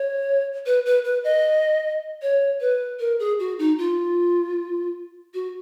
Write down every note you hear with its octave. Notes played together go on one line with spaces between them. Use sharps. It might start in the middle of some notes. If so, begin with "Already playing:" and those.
Already playing: C#5
B4
B4
B4
D#5
C#5
B4
A#4
G#4
F#4
D#4
F4
F#4